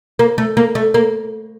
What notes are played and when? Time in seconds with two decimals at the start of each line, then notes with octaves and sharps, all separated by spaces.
0.19 A#3
0.38 A3
0.57 A#3
0.75 A3
0.94 A#3